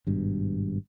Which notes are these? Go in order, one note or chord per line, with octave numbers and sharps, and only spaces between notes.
G#1 G2 B2